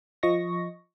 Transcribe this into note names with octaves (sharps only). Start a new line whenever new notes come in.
F3 D#5 C#6 A#6